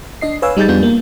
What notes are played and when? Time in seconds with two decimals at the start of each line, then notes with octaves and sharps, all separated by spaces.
0.21 D4 D#5 C7
0.42 B4 C#5 F5 G#5 E6
0.57 G3 D#4 G#4 G6 A6
0.68 F2 G3 B3 D4 F4 G6
0.83 A#3